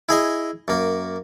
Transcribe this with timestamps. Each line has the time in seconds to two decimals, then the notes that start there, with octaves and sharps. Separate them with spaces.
0.09 E4 G#4 D#5 G#5
0.68 F#2 A#3